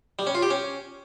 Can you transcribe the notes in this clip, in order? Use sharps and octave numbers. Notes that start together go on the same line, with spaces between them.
G3
C#4
F4
G4
C#4